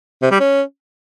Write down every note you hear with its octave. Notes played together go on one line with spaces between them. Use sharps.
C3
G3
C#4